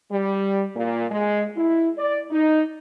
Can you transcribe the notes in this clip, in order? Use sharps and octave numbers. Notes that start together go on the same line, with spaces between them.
G3
A#2
G#3
E4
D5
D#4